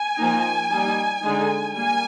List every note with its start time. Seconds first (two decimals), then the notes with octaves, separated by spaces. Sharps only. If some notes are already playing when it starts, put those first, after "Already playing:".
Already playing: G#5
0.17 F3 A#3 D#4
0.70 G3 A#3 D#4
1.22 D3 G#3 D#4
1.74 G3 A#3 G#5